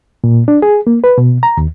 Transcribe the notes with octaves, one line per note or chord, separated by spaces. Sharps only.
A#2
D4
G#4
A#3
B4
B2
A#5
D#2